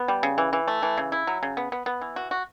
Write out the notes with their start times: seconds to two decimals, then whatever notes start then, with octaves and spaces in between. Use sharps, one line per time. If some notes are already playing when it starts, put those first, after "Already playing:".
Already playing: B3
0.08 G3
0.23 C#3
0.38 E3
0.53 E3
0.68 A3
0.83 E3
0.97 C#3
1.12 E4
1.27 F#3
1.43 C#3
1.57 B3
1.72 B3
1.86 B3
2.01 E3
2.16 F#4
2.31 F#4